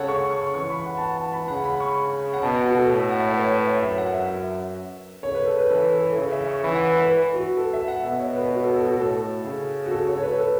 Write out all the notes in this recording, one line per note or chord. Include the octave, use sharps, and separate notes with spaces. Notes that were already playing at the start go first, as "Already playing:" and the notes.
Already playing: C#3 A4 C#5 F#5 A5
C#6
C#6
E3 C#6
B5
F#5
A5
F#5
A5
B5
C#3 F#5
B5
C#6
F#5
B2 A5
F#5
F#4
A4
A2
F#5
E5
C#5
B4
C#5
E5
F#2 E5
F#5
E5
C#3 C#5
B4
A4
B4
E3 A4
A4
A4
C#3 C#5
E5
C#6
E3 B5
F#5
E5
B4
B4
F#4
A4
E5
F#5
B2 E5
C#5
B4
F#4
A4
A4
F#4
A2 A4
C#3
F#4
A4
C#5
C#5
B4
A4